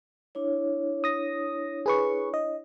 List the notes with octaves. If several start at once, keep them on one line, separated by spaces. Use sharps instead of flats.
D4 E4 C#5
D#6 A#6
G#4 B4 C#6
D#5